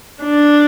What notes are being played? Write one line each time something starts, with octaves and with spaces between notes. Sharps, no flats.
D4